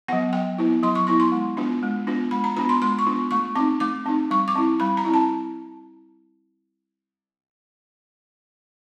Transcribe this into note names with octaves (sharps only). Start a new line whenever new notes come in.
F#3 B3 F#5
F#3 G5
B3 E4
F#3 C6
C#6
B3 E4 C#6
C6
G#3
B3 D4 F4
G#3
B3 D4 F4
G#3 B5
A#5
B3 D4 F4 B5
C6
G#3 C6
C#6
B3 D4 F4
A3 C#6
C4 D#4 D6
A3 D6
C4 D#4
G3 C#6
D6
C4 E4
G3 B5
A#5
C4 E4
A5